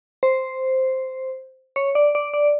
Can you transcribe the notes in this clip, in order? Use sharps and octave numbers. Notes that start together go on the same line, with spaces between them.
C5
C#5
D5
D5
D5